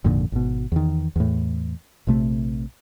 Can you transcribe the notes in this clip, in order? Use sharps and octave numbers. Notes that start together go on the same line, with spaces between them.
G#1 F2 A#2 D3
G#1 B2
E2 D#3
E2 A2
A#1 C3 A3